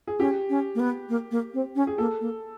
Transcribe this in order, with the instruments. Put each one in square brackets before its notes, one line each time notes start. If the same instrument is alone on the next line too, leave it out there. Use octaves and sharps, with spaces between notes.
[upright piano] G#4
[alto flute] C#4 [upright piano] G4
[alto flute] C#4
A#3
B3
A#3
A#3
C4
C#4
[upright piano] G#4
[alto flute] A#3 [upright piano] A4
[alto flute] A#3